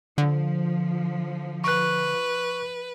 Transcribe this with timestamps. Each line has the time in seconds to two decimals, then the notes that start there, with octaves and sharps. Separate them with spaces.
0.18 D3 F3
1.64 B4 C#6 F#6